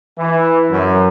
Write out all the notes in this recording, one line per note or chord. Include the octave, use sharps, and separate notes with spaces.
E3
F#2